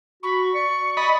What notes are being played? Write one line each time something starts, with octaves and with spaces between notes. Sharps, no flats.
F#4 B5 C#6
D5 C#7
D#5 B5 A6